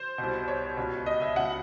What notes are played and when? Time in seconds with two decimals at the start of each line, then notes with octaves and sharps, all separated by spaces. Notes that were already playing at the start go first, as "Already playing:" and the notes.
Already playing: C5
0.18 C2 B2
0.48 C#5
0.77 C#2 B2
1.06 D#5
1.22 E5
1.36 C#2 B2 F#5